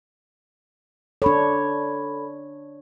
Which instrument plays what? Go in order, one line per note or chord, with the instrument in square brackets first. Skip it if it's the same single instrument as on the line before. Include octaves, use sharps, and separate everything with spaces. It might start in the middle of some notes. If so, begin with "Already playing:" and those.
[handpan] D4 C#5 [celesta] A4 B5